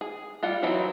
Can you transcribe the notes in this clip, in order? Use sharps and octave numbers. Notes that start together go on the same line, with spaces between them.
G#4
G3 F4 F#5
E3 F#3 C4 D#4 E4